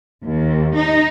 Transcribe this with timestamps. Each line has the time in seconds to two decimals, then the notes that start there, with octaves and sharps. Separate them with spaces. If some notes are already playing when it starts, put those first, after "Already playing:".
0.24 D#2
0.76 D#4